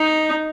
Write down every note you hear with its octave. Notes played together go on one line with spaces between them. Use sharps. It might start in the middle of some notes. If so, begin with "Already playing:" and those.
Already playing: D#4